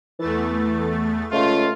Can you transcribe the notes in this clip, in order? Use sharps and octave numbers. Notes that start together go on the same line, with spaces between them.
E2 E3 A3 A6
C#2 A3 F4